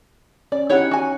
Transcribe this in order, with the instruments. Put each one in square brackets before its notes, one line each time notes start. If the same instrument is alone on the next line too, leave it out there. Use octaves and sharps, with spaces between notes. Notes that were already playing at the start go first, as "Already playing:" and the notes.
[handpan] C#4 [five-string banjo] D5
[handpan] C#4 D#4 F#5 [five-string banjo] E4 G4 C#5
[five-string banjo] F#4 G#5